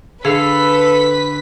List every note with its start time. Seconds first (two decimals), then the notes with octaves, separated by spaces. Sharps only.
0.25 D3 G#4 A4 B4 F5 B6